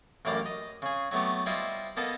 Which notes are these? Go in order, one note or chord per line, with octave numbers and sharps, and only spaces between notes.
A1 F#2 A#3 G4 D5 A#5
D#5
C#3 G#4
F#3 A3 B3 G4
G3 E4 F4 C5 D#5
A#3 B3 A4 D#5 A5